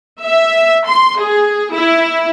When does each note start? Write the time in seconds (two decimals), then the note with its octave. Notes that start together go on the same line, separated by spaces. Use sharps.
0.23 E5
0.86 C6
1.19 G#4
1.73 E4